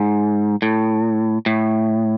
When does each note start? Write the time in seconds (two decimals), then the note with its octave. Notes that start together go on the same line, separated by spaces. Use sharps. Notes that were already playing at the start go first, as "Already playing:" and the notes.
Already playing: G#2
0.62 A2
1.46 A2